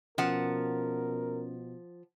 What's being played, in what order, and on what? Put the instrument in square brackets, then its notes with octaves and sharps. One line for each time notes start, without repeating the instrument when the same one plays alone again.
[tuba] B2 [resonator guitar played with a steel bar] F3 F#5 [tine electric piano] C#4 [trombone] A#4